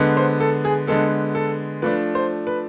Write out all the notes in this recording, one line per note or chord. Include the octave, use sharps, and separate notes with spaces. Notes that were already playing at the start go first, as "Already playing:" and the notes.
Already playing: D3 G#3 B3
C5
A4
G#4
D3 G#3 B3 A4
A4
F3 A3 D4 B4
C5
B4